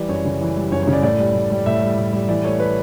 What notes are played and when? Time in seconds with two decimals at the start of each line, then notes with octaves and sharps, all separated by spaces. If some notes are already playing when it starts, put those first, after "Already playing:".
Already playing: E3 G3 B4 D5
0.09 F#2 C#5
0.25 C#3
0.41 E3
0.57 G3
0.72 F#2 C#5
0.83 C#5
0.87 C#3
0.93 D5
1.03 A2 D5
1.19 G3
1.35 A2
1.51 G3
1.66 A2 E5
1.82 G3
1.97 A2
2.13 G3
2.28 E3 D5
2.45 A3 C#5
2.60 B4